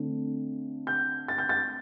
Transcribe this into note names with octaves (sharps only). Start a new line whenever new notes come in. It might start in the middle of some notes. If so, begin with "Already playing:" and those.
Already playing: D3 A3 C4
G6
A6
G6
A6